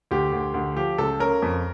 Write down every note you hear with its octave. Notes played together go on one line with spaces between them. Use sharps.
D2 G4
D2
D2
F3 G4
C#2 A4
C#4 A#4
F2